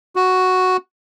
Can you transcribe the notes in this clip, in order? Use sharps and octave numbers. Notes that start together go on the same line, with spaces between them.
F#4